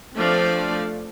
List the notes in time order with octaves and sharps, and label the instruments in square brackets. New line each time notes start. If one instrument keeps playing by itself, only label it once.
[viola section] F3 A3 C4 D4 D5 F5